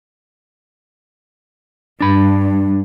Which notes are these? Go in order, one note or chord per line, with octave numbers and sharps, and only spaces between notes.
G2 D4 B5